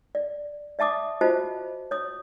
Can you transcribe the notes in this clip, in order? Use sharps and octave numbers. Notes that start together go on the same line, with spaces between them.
D5
D5 E5 A5 D6 D#6
F4 F#4 C5 D#5 A5
C#5 D#6